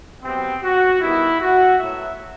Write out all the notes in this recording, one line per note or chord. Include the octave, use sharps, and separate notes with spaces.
C3 F#3 B3 C4
F#4
D#3 G3 B3 E4
F#4
A2 F#3 B3 E5